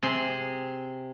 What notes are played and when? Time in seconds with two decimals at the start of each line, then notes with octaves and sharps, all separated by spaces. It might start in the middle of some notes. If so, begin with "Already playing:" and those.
0.03 C3 G#4 C6